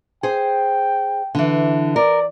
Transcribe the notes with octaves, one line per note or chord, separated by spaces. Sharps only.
G#4 C5 G5
D3 E3
A#4 D5